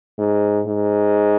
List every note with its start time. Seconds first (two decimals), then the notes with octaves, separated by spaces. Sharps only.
0.18 G#2
0.67 G#2